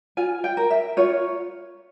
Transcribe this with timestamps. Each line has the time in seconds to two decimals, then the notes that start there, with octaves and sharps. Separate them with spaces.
0.17 F4 G#5
0.44 G5
0.57 A#4
0.70 E5
0.97 F4 C#5